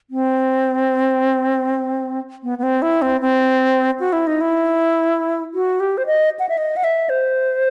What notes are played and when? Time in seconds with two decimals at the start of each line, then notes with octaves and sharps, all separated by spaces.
0.10 C4
2.43 B3
2.58 B3
2.63 C4
2.82 E4
3.02 C4
3.21 C4
4.00 F#4
4.13 E4
4.27 D#4
4.41 E4
5.54 F#4
5.80 G4
5.98 C5
6.06 D#5
6.39 F#5
6.49 E5
6.57 D#5
6.77 F#5
6.84 E5
7.09 C5